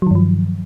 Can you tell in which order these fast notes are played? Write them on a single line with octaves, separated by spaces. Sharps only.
F#3 D#3 G2 F3